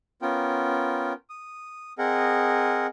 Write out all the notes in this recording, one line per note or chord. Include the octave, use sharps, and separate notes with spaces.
B3 C#4 F4 A#4 G5
D#6
C4 G#4 A#4 D#5 F#5